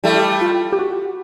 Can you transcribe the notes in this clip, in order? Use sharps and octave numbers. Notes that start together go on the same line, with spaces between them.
G3 A3 E4
F4
G4
F#4